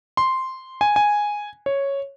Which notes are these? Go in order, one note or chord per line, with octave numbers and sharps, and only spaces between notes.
C6
G#5
G#5
C#5